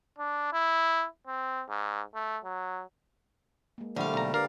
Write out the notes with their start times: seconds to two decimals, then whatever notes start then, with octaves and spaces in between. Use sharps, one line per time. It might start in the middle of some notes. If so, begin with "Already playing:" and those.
0.19 D4
0.53 E4
1.27 C4
1.69 G#2
2.15 A3
2.44 F#3
3.78 G#3 A#3
3.96 A#1 D3 G3 A3 E4 C5 D5 F5
4.14 B1 A#5
4.34 D4 G4 A#4 B4 D5 F5